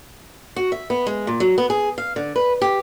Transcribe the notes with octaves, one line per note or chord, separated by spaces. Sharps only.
F#4
E5
B3
G#3
A#2
F#3
B3
G#4
F5
D3
B4
G4